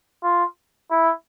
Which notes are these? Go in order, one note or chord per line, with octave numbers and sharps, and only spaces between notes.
F4
E4